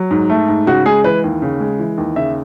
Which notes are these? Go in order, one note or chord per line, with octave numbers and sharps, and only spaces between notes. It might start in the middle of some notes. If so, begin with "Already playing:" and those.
Already playing: F#3
G#2
A3
G#2
C#3 F#4
G#3 G#4
E3 B4
D#2
C#3
G#3
E3
D#2
C#3 E5